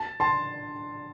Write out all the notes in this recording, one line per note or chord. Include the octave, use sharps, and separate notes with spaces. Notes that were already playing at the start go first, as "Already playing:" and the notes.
Already playing: A5
A5 C6